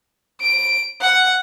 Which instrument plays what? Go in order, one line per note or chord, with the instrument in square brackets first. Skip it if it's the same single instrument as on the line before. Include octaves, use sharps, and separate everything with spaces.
[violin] D7
F#5